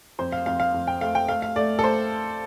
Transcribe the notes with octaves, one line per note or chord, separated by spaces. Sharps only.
F2 C5
F5
F2 F5
F5
F2
G5
A3 F5
G5
A3 F5
F5
A3 D5
A4
A3 C5